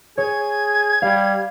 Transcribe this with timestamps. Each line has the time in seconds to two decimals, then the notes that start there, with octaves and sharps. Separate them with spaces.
0.18 G#4 C#5 G#6
1.02 G3 F5